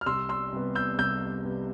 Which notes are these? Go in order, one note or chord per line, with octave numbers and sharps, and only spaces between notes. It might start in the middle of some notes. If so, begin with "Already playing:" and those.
F6
C2 C6 E6
C6 E6
C3 G3 B3
E6 G6
C2 E6 G6
C3 G3 B3